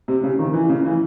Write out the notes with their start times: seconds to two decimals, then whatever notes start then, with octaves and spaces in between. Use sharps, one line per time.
0.08 C3
0.23 C#3
0.39 D#3
0.54 E3
0.69 C#3
0.85 E3